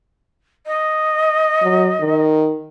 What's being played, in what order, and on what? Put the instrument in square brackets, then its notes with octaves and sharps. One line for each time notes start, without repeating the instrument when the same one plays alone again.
[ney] D#5
[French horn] F#3
D#3